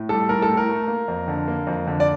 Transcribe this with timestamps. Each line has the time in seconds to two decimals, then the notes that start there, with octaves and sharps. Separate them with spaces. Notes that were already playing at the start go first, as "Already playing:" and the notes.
Already playing: A2
0.09 G3 A4
0.29 A2 A#4
0.42 A4
0.49 A2
0.57 A#4
0.69 A3
0.88 A#3
1.08 F2
1.28 D3
1.48 A#3
1.67 F2
1.87 D3
2.00 D5